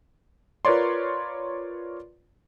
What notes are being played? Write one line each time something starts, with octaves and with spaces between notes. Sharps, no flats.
F4 A#4 B4 C#5 D5 C6